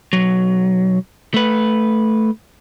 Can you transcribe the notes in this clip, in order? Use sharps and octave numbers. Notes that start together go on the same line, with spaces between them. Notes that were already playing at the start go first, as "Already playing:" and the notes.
B1 F#3
A3 B4